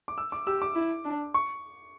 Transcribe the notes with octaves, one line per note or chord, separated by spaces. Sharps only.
D6
E6
D6
G4 E6
D6
E4
D4
C#6